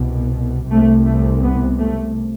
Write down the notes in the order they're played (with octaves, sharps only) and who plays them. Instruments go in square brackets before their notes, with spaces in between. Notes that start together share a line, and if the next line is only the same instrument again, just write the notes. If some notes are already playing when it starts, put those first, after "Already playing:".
Already playing: [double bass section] C2 B2
C2 C3 A3
A3
B3
A3